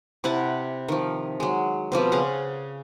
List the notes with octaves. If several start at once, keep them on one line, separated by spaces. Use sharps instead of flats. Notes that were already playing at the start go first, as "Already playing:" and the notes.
C3 E4 F#5 A5
D#3 F3
F#3 G#3
B2 F3 G3 C4
C#3 G#4 F5 F#5